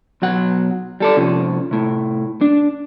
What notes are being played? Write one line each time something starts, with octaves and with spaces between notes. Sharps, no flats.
B1 F#3 F#5
G3 A4 D5
C3 F3 C#4
A2 C3
D4